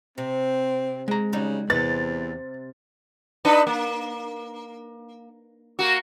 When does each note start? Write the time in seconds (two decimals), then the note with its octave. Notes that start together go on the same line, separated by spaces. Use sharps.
0.18 C3 C4
1.08 G#3 A#5
1.33 C#3 F#3 G3 D#4
1.70 E2 C3 B4 A6
3.45 D4 D#4 B4
3.67 A#3
5.79 A#3 F#4